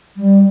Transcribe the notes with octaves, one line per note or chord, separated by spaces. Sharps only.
G3